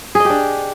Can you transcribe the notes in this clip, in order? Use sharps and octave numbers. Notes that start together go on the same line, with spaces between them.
D4 G4 G#4 D#5